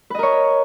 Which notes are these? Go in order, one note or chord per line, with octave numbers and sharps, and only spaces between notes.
A#4 B4 C#5 D#5